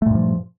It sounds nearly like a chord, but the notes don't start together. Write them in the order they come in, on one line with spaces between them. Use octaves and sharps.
A3 A#2 G2 F3